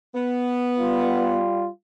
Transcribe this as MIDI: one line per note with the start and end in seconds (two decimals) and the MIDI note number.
0.15 1.41 59
0.79 1.68 55
0.79 1.68 65